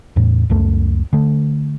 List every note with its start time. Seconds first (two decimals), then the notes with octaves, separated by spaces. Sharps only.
0.16 E2 A2
0.50 C#2 F#2 A3
1.13 D3 A3